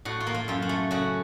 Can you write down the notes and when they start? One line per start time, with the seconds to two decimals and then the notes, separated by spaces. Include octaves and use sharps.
0.05 A2 F#4
0.20 F4
0.27 A#3
0.34 F4
0.48 F#2 F4
0.62 F#4
0.69 A3
0.91 C#3 F#4